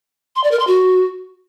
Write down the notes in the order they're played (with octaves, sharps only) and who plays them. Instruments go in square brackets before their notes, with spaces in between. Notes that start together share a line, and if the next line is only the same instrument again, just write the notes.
[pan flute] C6
D5
A#4
C6
F#4